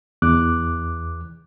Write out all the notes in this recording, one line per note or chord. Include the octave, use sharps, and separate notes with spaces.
E2 D6 F#6